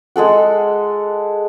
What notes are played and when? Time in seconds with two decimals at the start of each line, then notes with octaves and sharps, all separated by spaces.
0.16 G#3 G#4 A4 F#5